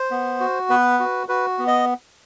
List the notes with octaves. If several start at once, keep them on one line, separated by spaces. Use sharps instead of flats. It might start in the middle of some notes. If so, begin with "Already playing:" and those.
Already playing: C5
B3
F#4
B3 B4
F#4
F#4 B4
B3
D#5